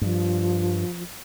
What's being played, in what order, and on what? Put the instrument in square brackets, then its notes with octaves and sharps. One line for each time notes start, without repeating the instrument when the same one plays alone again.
[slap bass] G2 [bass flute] F3